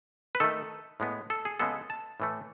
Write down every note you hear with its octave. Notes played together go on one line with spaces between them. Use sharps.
B4
D#3 A3 A4
A2 G#3 B3
A4
G#4
C#3 G#3 B3 A4
A5
A2 E3 A3